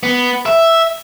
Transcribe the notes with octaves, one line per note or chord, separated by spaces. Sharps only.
B3
E5